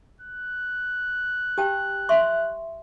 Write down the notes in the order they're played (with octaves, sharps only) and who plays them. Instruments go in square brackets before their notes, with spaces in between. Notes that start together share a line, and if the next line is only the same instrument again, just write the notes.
[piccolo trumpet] F#6
[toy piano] G4 G5 A5
E5 C6 C#6